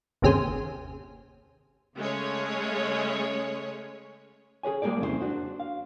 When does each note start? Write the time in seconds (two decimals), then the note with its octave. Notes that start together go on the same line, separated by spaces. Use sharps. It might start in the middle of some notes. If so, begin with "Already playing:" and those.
0.22 G1 D#2 C3 C#4 G#4 C5
1.97 C#3 G#3 A3 C#4 G#4 C#5
4.63 G#4 B4 C#5 G#5
4.82 G3 G#3 A#3 G#4 A#4 D5
5.01 F2 C#3 E4 G4 C5
5.21 D4 F#4 C5
5.60 F5